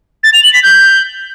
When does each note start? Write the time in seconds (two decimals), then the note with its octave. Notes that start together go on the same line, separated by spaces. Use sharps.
0.23 A6
0.33 F7
0.43 F#7
0.53 B6
0.63 G6